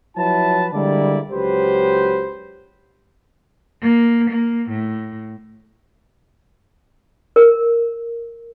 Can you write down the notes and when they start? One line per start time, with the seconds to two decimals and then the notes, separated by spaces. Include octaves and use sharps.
0.17 F3 F#3 E4 B4 A5
0.73 D3 G3 G#3 A#3 E4 D5
1.31 C#2 F#3 G4 B4 C5
3.82 A#3
4.30 A#3
4.70 A2
7.36 A#4